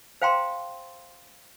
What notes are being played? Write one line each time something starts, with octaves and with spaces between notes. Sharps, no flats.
C5 F5 G5 A#5 C6